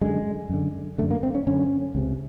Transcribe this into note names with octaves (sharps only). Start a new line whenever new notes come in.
F#2 D3 G#3
F#2 D3
F#2 D3 A3
A#3
C4
C#4
F#2 D3 C#4
C#2 C3